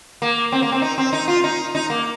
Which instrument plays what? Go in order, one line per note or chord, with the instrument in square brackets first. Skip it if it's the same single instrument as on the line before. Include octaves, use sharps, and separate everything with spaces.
[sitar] A#3
C4
A#3
C4
D#4
C4
D#4
F4
D#4
D#4
A#3